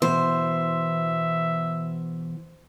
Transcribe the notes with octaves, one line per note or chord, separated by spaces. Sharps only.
B2 E3 C5 E5